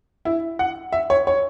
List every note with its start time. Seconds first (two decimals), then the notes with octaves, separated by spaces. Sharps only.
0.25 E4
0.59 F#5
0.93 E5
1.10 C#5
1.27 C#5